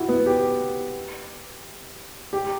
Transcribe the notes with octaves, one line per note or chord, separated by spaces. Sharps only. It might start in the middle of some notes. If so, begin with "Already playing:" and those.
Already playing: E4 F#4 G4
B3
G4
G4